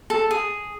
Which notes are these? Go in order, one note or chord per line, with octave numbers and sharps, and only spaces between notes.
A4
G#4